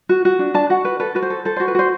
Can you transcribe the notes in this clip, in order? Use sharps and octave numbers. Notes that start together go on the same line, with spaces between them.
F#4
F#4
D4
D4 A5
F#4 F#5
B4
A4 B4
F#4 B4
C5
A4
A4 C5
C5
F#4
B4
F#4 C5